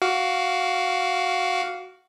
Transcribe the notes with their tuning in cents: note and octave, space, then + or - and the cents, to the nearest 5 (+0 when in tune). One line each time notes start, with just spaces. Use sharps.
F#4 +0 F5 +0 D6 -40